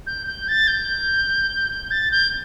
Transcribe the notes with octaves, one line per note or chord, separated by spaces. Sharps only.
G6
G6
A6
G6
A6
G6